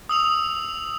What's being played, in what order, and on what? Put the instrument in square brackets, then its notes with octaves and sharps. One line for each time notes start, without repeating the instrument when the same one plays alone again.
[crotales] D#6 E6 F7